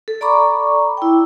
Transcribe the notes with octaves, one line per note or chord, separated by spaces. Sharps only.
A4
D5 A#5 B5 C#6 D6
E4 G5